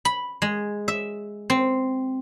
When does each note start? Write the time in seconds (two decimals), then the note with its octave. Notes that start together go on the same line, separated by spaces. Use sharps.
0.05 B5
0.42 G#3
0.88 E5
1.50 C4